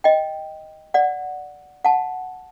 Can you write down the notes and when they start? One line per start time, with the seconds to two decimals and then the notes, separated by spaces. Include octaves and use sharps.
0.04 D#5 G5
0.94 D5 F#5
1.85 F#5 A5